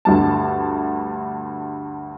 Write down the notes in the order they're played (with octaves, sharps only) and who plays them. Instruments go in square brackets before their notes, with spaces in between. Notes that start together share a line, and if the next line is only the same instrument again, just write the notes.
[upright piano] D2 G2 A5